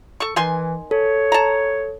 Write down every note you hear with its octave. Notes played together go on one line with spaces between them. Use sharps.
A4 C#6
D#3 E3 G#5 C6
A4 C#5
A5 A#5